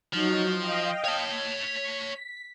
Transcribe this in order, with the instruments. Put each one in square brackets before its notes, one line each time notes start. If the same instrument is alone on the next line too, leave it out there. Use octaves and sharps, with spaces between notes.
[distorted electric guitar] F3 [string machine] F#3 D#4 F#4
[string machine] D#5 F5 G5
[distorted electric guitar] C#5 A5
[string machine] B6